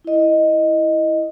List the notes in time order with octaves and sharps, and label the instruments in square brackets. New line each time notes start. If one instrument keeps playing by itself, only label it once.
[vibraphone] E4 D#5